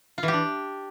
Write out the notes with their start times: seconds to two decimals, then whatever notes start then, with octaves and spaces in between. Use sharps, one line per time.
0.18 F4
0.23 E3
0.28 G4
0.33 D4